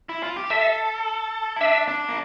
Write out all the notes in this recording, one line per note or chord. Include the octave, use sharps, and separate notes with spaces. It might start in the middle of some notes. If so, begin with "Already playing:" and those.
E4
F4
G4
A4 E5
E4
D4 E5
D4
A#3